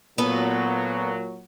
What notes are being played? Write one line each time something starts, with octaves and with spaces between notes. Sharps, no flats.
A#2 F#3 B3 A4 B4